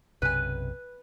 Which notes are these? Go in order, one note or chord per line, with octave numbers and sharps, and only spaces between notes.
B1 F#2 C3 B4 G#5